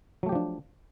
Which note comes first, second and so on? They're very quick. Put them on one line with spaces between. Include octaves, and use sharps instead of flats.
F#3 A3 G4 F3 D4